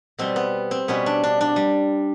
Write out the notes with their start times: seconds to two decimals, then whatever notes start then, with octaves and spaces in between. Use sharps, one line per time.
0.18 B2 G3 B3 C4
0.36 B3
0.71 C4
0.88 B2 G3 B3 C#4
1.06 D4
1.23 D4
1.41 D4
1.56 G3